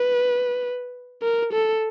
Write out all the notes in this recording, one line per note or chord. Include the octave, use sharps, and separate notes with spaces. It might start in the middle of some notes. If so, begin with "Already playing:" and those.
Already playing: B4
A#4
A4